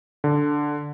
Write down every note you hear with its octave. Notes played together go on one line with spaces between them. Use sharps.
D3